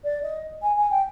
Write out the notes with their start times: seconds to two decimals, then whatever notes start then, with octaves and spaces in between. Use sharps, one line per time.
0.04 D5
0.23 D#5
0.62 G#5
0.77 G#5
0.91 G5